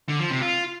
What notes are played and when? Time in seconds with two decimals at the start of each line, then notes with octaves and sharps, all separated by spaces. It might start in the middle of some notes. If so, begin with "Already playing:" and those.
0.09 D3
0.20 F3
0.31 C3
0.42 F4